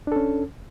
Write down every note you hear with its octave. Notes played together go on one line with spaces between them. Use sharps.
C#4 D4 A4